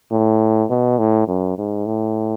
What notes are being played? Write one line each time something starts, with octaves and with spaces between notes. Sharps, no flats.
A2
B2
A2
F#2
G#2
A2